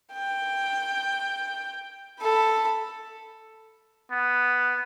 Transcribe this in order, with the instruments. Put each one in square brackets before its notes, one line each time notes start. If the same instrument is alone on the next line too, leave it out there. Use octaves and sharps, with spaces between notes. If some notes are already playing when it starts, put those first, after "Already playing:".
[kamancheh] G5
A4 B5
[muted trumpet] B3